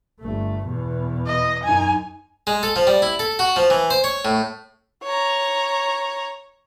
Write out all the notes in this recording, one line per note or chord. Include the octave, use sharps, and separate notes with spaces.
G1 A3
E2 B2
D#5
F#2 D#4 G#5
G#3
A4
F3
G3
E4
A4
F#4
F3
E3
C5
C#5
A2
C#5 A#5